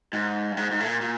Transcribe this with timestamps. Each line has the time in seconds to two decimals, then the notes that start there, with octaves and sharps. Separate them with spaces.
0.13 G#2
0.52 G2
0.57 G#2
0.71 G#2
0.80 A2
0.86 A#2
1.01 A#2